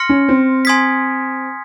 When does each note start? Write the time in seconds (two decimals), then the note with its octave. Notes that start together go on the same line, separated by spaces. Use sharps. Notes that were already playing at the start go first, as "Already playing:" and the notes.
Already playing: C6 F6 A#6 C#7
0.09 C#4
0.29 C4
0.65 G#5 C6 D#6 G#6 B6